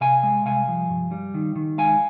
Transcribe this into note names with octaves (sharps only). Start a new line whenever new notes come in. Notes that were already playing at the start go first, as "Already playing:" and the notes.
C3 F5 G#5
G#3
C2 F5 G#5
F3
G2
G3
D#3
D#3
G#3 F5 G#5